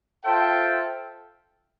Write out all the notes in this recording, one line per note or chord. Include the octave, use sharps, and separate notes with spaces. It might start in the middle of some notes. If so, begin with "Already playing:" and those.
F4 A4 C5 E5 G5